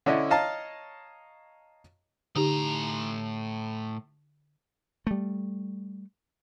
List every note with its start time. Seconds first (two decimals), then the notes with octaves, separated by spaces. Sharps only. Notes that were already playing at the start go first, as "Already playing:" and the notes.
0.06 D3 C#4 D4 E4 D#5 E5
0.30 C#5 D#5 F5 A5 A#5
2.36 A2 D3 D#4 G4 A#5
5.07 G3 A3